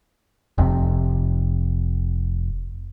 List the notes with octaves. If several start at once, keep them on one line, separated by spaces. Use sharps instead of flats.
F1 F2 G#2 C3